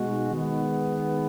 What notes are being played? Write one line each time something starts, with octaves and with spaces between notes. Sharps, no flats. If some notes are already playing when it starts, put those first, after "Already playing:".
Already playing: B2 G#3 D#4 F#4
D#3 G#3 B3